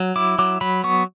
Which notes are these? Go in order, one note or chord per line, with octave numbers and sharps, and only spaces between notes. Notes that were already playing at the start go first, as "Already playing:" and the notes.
Already playing: F#3
E4 D6
F#3 D6
F#3 B5
B3 C#6